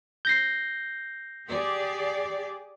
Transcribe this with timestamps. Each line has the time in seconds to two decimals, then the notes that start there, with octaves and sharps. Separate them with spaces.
0.25 G6 A#6 C7
1.48 G4 G#4 D5